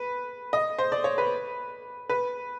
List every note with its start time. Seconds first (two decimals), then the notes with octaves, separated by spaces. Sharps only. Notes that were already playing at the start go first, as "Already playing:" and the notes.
Already playing: B4
0.53 D#5
0.79 C5
0.92 D5
1.04 C#5
1.18 B4
2.09 B4